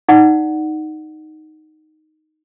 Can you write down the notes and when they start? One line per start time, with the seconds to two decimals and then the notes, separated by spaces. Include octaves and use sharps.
0.09 D#4 D5 F#5